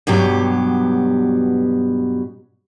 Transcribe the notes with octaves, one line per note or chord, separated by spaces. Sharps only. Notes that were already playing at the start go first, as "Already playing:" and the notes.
G2 B2 F#3 G4